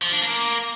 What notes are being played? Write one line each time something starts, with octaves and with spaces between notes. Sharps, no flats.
F3
D4
A#3